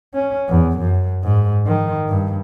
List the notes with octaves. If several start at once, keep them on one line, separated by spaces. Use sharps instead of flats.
C#4
E2
F#2
G#2
D#3
G2